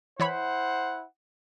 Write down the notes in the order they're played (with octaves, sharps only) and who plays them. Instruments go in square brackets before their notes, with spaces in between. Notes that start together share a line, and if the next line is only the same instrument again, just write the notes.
[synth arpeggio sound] E3 C#5 B5 [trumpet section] E4 C5 F#5